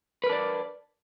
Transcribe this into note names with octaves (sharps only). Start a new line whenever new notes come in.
D4 A#4 B4 D5